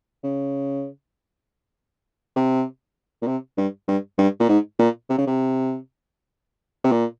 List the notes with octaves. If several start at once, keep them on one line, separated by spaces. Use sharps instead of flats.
C#3
C3
A#2
C3
G2
G2
G2
A#2
G#2
A#2
C3
C#3
C3
C3
A#2